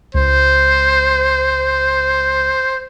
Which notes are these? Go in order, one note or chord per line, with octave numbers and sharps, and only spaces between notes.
C#2 C5